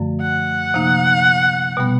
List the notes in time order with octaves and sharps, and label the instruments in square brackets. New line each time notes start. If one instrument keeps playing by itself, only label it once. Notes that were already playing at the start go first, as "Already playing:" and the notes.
Already playing: [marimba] F#2 D3 F3 A3
[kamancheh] F#5
[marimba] C3 F3 A#3 D#4
B2 G3 B3